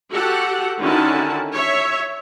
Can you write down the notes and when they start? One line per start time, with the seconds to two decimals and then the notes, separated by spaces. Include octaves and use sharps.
0.10 F#4 G4 A4 F#5
0.79 D3 D#3 C#4 E4 F#4 A5
1.53 C#5 E5